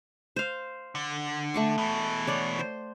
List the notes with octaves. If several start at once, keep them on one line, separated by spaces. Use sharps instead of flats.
C5 F5
D3
A3 C#6 D6
B2 E3
C#5 D5 F#5
C5